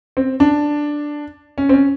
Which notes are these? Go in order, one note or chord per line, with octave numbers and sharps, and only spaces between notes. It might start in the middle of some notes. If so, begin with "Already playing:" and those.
C4
D4
C#4
C4
C#4